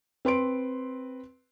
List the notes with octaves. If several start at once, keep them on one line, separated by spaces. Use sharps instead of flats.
C4 B4 C6 D7